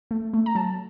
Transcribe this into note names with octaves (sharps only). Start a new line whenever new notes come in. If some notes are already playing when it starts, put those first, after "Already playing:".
A3
A3
A#5
F#3 A5